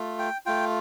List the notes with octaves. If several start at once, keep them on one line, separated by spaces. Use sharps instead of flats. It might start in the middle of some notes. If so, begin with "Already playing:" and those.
Already playing: A3 F4
G5
A3 F4 G5